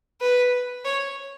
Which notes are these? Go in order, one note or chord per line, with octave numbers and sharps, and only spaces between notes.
B4
C#5